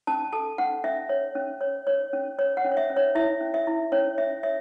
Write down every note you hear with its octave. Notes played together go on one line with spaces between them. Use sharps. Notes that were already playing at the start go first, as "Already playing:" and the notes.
C#4 A5
A4 A5
C#4 F#5
C#4 E5
C#5
C#4
C#5
C#5
C#4
C#5
F#5
C#4
C#5
E5
C#4
C#5
E4 E5
C#4
E5
E4
C#4 C#5
C#4 E5
C#5 E5